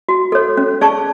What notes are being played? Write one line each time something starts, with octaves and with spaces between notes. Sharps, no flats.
F#4
A4 C#5
C#4
G#4 D5 A5 C#6